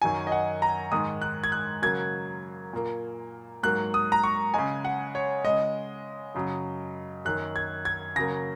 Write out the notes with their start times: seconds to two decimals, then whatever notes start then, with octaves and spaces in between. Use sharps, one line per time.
0.02 F#2 D#3 F#3 G#5
0.27 D#5
0.32 F#5
0.62 A#5
0.92 G#2 D#3 G#3 D#6
1.22 F#6
1.44 G#6
1.52 F#6
1.82 C#3 F#3 A#3 G#6
2.73 A#2 A#3
3.63 G#2 F#3 A#3 F#6
3.94 D#6
4.12 A#5
4.24 C#6
4.54 C#3 G#3 G#5
4.85 F#5
5.15 C#5
5.44 C#3 G#3 D#5
6.35 F#2 C#3 F#3
7.25 F#2 D#3 A#3 F#6
7.56 G#6
7.85 G#6
8.16 C#3 F#3 A#3 A#6